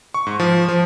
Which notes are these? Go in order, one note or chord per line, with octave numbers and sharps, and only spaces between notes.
C#6
G#2
F3
F3